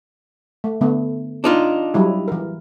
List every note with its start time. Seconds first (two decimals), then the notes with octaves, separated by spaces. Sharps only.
0.64 A3
0.81 D3 A3 B3
1.44 D4 D#4 F4
1.94 F#3 G3 E4
2.28 E3 A#4